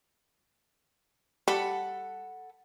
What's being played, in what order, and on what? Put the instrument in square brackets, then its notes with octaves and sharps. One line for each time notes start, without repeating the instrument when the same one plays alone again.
[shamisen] G3 [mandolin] A4 F#5 B5